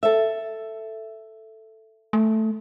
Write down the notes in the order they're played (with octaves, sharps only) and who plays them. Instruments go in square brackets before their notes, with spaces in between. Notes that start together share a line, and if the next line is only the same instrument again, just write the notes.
[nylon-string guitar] A4 E5
[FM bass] A3